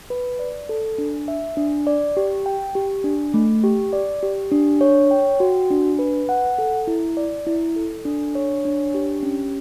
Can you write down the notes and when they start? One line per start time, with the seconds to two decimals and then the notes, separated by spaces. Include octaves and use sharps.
0.10 B4
0.39 D5
0.69 A4
0.98 D4
1.28 E5
1.57 D4
1.87 D5
2.17 G4
2.46 G5
2.75 G4
3.04 D4
3.34 A3
3.64 G4
3.93 D5
4.23 G4
4.52 D4
4.81 C#5
5.11 G5
5.40 F#4
5.70 D4
5.99 B4
6.29 F#5
6.59 A4
6.87 E4
7.17 D5
7.47 E4
7.76 A4
8.05 D4
8.35 C#5
8.65 D4
8.94 G4
9.23 C#4